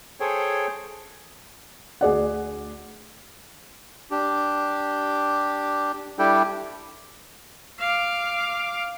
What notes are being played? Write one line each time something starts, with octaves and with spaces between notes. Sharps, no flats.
G#4 A4 C5 C#5 G5
D2 G#4 D5 F#5
D4 G4
G3 D4 E4 G4 A4 G5
F5 D6